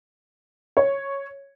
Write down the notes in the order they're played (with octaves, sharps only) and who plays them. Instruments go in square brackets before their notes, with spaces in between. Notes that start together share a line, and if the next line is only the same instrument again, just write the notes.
[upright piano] C#5